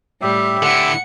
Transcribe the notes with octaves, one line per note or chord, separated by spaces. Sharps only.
A2 G3 G4 E5
D3 E4 F#5 C#7